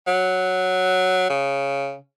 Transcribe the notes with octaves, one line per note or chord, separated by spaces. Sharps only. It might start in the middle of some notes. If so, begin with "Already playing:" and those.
F#3
C#3